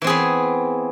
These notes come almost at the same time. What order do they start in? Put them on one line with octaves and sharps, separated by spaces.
E3 C4 G#4 B3